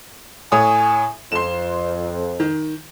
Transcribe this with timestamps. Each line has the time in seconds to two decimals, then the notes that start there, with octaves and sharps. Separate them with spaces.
0.52 A2 C#5 G#5 D#6
1.32 F2 C6 E7
2.40 D#3